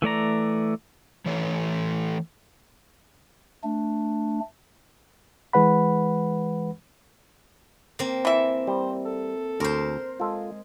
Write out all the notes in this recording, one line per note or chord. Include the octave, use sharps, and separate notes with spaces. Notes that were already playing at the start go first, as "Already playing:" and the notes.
E3 A3 D5 A#5
E3 A3 C#5
A3 D4
E3 G#3 B4 F#5 B5
A#3 C4
E3 E5
G3 C5
A4
D2 A#4 C5
G#3 F4 A4